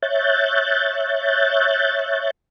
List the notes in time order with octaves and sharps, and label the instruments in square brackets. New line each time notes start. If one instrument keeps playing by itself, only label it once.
[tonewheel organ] C#5 E5 F#6 G6 A6